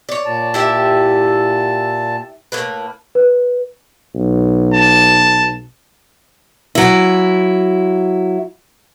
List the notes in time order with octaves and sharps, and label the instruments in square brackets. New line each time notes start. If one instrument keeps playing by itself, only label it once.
[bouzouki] C#5 D5
[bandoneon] A#2 A5
[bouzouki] E4 G4 E5
A2 A#3 B4
[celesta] B4
[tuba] B1
[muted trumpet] A5
[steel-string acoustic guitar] F#3 E4